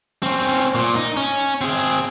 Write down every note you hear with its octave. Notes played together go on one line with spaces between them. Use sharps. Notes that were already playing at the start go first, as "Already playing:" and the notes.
C4 C#4
A#2
D#4
C#4
C4 G#4